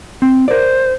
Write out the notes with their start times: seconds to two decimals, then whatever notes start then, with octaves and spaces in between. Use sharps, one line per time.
0.22 C4
0.48 A#4 C5 D5